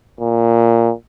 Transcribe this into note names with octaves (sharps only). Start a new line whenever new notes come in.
A#2